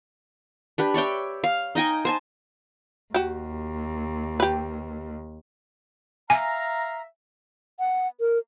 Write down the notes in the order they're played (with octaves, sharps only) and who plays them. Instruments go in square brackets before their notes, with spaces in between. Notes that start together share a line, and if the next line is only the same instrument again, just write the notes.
[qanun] D4 G4 B4
C#5 D5 E5 G5
F5
D#4 D#5 G5 G#5
C5 G#5 A5
[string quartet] D#2 [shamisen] F#4 G4
[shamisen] G4 B4
[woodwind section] E5 F5 A#5 [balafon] G#5
[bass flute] F#5
A#4